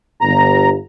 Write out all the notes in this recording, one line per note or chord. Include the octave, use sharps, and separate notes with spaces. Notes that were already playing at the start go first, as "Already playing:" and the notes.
G1 G2 A#5